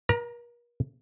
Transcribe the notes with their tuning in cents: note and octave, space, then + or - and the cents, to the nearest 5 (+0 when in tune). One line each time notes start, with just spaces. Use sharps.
A#4 +40 A#5 +0